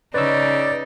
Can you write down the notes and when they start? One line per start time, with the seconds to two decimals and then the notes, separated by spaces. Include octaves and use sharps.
0.14 C#3 D#4 B4 C#5 D5 E6